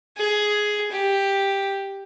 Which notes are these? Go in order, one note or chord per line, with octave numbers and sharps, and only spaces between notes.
G#4
G4